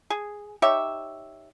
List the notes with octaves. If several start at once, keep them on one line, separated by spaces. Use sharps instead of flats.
G#4
D#4 G4 C#5 E5